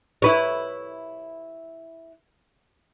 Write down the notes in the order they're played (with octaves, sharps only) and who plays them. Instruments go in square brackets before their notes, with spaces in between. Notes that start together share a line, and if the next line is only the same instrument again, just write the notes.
[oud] E4 B4 C#5